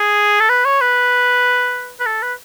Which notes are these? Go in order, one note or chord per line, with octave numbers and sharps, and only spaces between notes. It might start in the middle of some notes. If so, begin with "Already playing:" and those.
Already playing: G#4
A4
B4
C#5
B4
B4
A4
B4